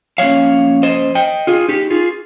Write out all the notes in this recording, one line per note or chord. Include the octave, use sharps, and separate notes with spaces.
F3 A#3 C#4 C#5 F5
C5 D#5
D#5 G5
F4 G#4
D#4 G4
F4 G#4